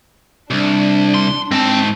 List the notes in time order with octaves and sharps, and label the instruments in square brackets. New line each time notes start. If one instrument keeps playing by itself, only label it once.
[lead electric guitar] C2 [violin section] D4
[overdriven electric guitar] C6
[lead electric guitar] G#2 A5 [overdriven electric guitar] C4